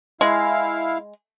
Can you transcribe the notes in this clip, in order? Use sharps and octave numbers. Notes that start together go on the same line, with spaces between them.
G#3 E4 F5